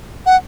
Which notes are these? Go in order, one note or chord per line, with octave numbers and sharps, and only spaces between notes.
F#5